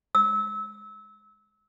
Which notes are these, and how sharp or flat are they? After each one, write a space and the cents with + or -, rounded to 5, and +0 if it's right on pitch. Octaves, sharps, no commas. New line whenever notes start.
E6 -25